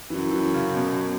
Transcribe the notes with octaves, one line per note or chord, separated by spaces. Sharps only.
F#2 E3
E3
C#3
B2